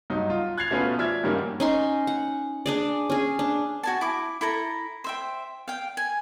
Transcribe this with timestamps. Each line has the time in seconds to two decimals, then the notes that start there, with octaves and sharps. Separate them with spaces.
0.10 G2 F#3 D#4
0.30 F4
0.58 F#6 G#6 A6 C7 F7
0.70 B2 A3 B3 C#4 F4 B4
0.98 F3 D5 E5 F6 G#6
1.23 G2 D#3 F#3 G3 A#3 C#4
1.60 C#4 D#4 C6
2.07 F#5
2.66 D4 G#4 D5
3.10 C#4 G#4
3.39 D4
3.83 F#4 G#5 A5
4.01 E4 D6
4.41 E4 A4 A#5
5.04 C5 E5 G5
5.68 F5 G5
5.97 G#5